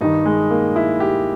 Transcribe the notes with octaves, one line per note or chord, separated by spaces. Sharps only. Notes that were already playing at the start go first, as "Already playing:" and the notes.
G2 D#3 D#4
G#3
A#3
E4
G4